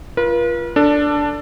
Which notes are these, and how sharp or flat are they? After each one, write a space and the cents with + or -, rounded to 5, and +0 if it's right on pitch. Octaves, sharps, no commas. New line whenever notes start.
F4 -20 B4 -45
D4 +0 A4 +20